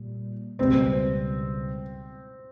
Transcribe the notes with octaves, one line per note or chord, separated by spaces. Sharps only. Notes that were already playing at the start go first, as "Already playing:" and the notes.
Already playing: A#2 G3
C#2 B2 G3 B3 C4